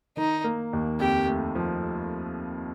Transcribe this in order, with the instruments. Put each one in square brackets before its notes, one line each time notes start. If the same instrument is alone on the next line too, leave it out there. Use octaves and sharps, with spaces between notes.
[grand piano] D#3 [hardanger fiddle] D#4
[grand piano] A#3
D#2
[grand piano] F2 [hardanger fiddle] G4
[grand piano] A3
F3